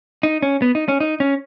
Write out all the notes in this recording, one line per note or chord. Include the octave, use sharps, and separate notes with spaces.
D#4
C#4
B3
D#4
C#4
D#4
C#4